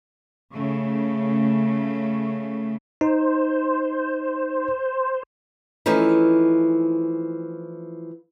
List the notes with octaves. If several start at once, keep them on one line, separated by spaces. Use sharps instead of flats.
C#3 A3
D#4 C5
E3 F3 A3 C#4 D#4